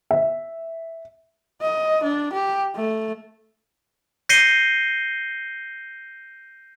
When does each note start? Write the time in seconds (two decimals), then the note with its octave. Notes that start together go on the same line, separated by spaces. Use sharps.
0.11 E5
1.62 D#5
2.04 D4
2.33 G4
2.76 A3
4.29 G6 A#6 C7 C#7 D#7 G7